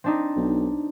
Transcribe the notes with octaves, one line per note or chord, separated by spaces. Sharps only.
C4 D4 D#4
B1